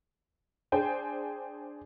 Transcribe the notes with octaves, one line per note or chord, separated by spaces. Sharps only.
D4 G#4 C5 G5 G#5